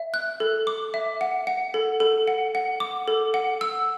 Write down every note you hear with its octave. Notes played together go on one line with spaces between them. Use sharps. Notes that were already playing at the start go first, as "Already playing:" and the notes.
Already playing: E5
F#6
A4
D6
E5
F#5
F#5
A4
A4
F#5
F#5
D6
A4
F#5
E6